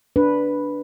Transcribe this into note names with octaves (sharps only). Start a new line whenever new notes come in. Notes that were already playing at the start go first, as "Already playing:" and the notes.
D4 B4